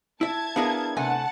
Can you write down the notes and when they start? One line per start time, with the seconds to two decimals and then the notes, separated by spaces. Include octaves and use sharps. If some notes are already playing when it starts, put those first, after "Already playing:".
0.21 E4 E5 A5 G#6
0.56 B3 D4 E4 G#4 A#4 F5
0.97 C3 A3 F#5 G#5 A5